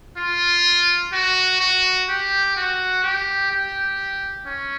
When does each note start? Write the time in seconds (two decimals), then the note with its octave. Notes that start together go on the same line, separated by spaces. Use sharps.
0.17 F4
1.13 F#4
1.60 F#4
2.09 G4
2.56 F#4
3.04 G4
3.52 G4
4.47 C#4